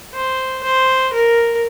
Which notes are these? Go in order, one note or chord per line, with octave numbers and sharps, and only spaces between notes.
C5
C5
A#4